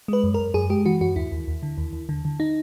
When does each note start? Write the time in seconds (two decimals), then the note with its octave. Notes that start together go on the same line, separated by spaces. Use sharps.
0.08 G#3 B4
0.24 F#2
0.34 F#2 A#4
0.54 F#2 G#4
0.70 G#3 G4
0.86 E3 F#4
1.01 F#2 F#4
1.16 D#2 E4
1.32 D#2
1.48 D#2
1.63 D3
1.78 D#2
1.93 D#2
2.09 D3
2.25 D3
2.40 D#4